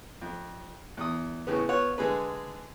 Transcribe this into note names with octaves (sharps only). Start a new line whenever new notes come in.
F2
E2 D#6
A2 C#3 B3
B3 F4 C#5 F#5
D3 G#3 G#4 B4